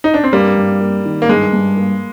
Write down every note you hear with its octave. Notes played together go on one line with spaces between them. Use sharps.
D#4
D4
C4
G2 G3 A#3
G2
A#3
D#3
A#3
G2 G#3
G2
A#3